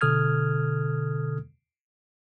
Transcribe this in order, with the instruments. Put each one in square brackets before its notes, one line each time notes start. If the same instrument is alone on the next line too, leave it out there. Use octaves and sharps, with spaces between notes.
[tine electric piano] B2 D3 A4 D#6 F6 G#6